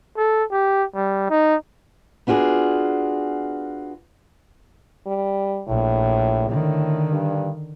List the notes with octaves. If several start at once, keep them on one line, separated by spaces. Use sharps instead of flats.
A4
G4
G3
D#4
B3 D4 F4 F#4 G#4
G3
A#1 A2
A2 D3 D#3
G2